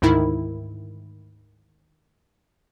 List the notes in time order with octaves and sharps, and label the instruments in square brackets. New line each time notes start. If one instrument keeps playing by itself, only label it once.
[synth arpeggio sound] D2 G#2 D#3 E4